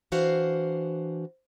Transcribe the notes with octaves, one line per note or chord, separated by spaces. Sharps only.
E3 D4 F#4 C5 F5